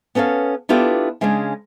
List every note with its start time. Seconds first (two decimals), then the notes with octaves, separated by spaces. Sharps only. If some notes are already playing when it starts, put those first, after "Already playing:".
0.15 B3 C#4 A4 C#5 F5
0.69 B3 D4 E4 F4 G4 A4
1.21 C#3 G#3 C#4 D4 G#5